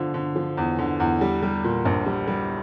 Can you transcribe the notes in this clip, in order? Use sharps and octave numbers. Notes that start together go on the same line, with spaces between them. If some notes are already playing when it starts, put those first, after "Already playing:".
Already playing: D3 F3
D3
F3
E2
D3
E2
G3
G3
A#2
A#1
G3
G3